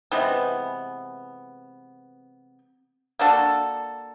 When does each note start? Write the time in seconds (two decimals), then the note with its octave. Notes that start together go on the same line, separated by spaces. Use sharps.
0.12 C3 E3 G#3 B3
3.19 A#3 D4 F#4 A4